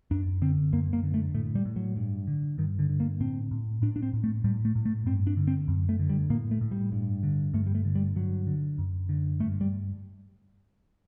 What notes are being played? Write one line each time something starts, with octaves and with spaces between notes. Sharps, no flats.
F#2 D4
D3 C4
F#2 A#3
A#3
D3
A3
A2 A3
G3
A2
F#3
G2
D3
G2 D#3
D3
D3
A#3
A2 C4
A2
A2 D4
D4
C4
A2
A3
A2 G3
A3
A2
A3
G2 C4
D4
D3
C4
F#2
A3
D3
G3
A2 A#3
A3
A2
G3
G2
D3
G2 A3
G3
A3
D3
G3
G2 F#3
D3
F#2
D3
G2 A3
G3